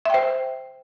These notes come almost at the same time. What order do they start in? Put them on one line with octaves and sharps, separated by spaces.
E5 G5 C5